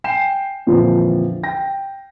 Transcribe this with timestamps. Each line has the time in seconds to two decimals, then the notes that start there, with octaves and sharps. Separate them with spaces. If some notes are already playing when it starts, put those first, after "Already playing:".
0.04 G5 G#5 C7 E7
0.67 F2 A#2 D3 E3 F3
1.43 G5 A#6